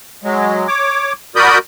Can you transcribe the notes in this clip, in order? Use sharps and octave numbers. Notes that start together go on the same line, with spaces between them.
F#3 G#3
C#5 D6
F#4 A#4 D5 B5 D#6 G6